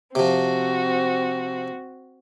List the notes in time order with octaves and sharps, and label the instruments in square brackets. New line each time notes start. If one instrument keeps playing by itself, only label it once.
[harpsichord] C3 F3 [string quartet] C4 F#4